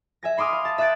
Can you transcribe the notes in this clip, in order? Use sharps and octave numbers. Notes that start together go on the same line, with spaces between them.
E5 G#5 A#6
B5 C6 D6 D#6 F6
F5
A5
E5 D#6 F#6 G6 A6 D7